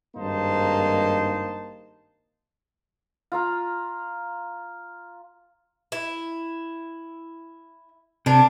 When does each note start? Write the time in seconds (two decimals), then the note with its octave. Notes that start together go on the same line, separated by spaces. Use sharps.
0.17 G#1 G2 A#3 D#4 C5 A5
3.32 F4 F5 A#5
5.92 E4
8.26 C3 D4 A#4